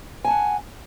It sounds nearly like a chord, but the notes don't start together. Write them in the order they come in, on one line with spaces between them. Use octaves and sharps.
G#5 A5 F#5